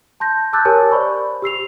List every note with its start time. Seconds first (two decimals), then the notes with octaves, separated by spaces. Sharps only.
0.20 A5 C6 G6 A#6
0.53 A5 D6 E6 F#6 G6 A6
0.65 G4 A#4 C#5 G#5 A5
0.91 C5 D5 B5 C#6
1.42 G4 E6 C7 F7